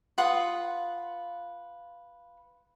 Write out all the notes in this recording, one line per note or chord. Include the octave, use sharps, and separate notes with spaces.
F4 B4 F#5 D#6